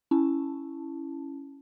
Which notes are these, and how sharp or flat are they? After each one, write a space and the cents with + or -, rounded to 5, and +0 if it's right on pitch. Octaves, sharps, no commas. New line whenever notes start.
C#4 +0 E4 +0 A5 +0